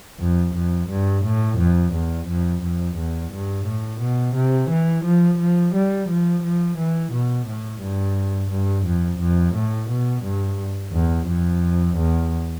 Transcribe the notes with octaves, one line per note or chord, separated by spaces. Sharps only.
F2
F2
G2
A2
F2
E2
F2
F2
E2
G2
A2
B2
C3
E3
F3
F3
G3
F3
F3
E3
B2
A2
G2
G2
F2
F2
A2
B2
G2
E2
F2
E2